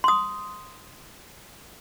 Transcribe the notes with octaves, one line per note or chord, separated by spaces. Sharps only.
C6 D#6